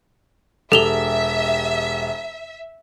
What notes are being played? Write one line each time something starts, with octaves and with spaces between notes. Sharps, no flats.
E1 G4 A4 E5 F7 G7